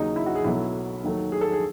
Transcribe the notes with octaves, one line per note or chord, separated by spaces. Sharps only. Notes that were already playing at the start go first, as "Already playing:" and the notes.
Already playing: D#2 C#3 F#3 D#4
E4
F#4
G#4
B1 B2 F#3 A3 E4
D#2 D#3 F#3 A3
G#4
A4
G#4